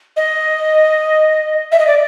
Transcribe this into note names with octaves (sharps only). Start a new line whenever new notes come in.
D#5
E5
D#5
D5